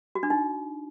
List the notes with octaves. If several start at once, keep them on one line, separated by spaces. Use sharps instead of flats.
F#4
D4
D#4